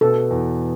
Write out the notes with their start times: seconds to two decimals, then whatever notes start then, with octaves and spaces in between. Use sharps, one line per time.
0.01 B2 A4
0.30 E2